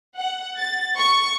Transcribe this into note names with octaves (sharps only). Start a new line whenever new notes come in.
F#5
A6
C#6